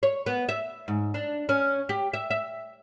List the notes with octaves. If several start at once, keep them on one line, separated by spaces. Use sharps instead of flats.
C#5
B3
E5
G#2
D4
C#4
G4
E5
E5